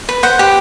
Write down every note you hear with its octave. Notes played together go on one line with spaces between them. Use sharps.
B4
C5 F#5
G4